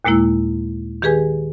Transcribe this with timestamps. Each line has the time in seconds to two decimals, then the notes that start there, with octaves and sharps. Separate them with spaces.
0.05 D#2 A#2 G#3 A#3 E4 E6
1.02 D#3 G4 G#4 B4 G#5